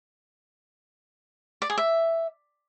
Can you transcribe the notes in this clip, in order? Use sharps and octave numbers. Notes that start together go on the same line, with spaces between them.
D5
G#4
E5